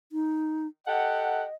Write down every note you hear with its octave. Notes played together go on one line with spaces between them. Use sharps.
D#4
G4 A4 D#5 F#5